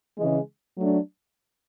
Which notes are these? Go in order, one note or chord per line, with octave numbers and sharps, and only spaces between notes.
C#3 E3 G#3
F#3 A3 D4